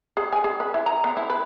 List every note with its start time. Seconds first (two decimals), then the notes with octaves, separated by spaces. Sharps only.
0.17 G#4
0.33 G#5
0.44 G#4
0.60 B4
0.74 E4
0.86 A#5
1.04 B3
1.17 E4
1.30 B4